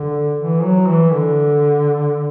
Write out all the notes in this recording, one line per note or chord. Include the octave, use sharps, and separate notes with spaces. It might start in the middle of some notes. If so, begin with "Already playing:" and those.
Already playing: D3
E3
F#3
E3
D3